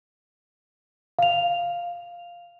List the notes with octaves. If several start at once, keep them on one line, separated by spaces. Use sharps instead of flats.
F5 F7